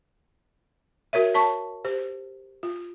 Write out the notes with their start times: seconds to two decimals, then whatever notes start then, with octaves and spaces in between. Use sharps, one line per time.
1.13 F#4 A#4 C#5 E5
1.35 C#5 A5 C#6
1.85 G4 C5
2.63 F4